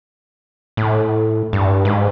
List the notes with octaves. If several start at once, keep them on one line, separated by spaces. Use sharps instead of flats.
A2
G2
G#2